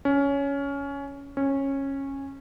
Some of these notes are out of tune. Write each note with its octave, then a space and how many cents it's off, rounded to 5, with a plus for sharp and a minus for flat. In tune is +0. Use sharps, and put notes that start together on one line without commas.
C#4 +15
C#4 -15